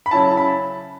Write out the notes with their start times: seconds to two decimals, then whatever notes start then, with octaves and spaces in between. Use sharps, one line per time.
0.06 B5
0.11 C#3 F#3 C#4 E4 A5
0.37 B5